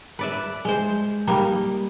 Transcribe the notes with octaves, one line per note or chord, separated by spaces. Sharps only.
B4 D5 E5
G#3 C5
G3 A#3 D#4